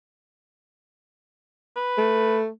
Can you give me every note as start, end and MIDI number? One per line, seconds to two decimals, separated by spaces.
1.76 2.38 71
1.98 2.48 57